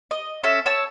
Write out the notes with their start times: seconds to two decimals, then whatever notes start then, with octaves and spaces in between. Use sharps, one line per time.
0.11 D#5
0.43 C#4 A4 E5
0.66 C#5 A5 E6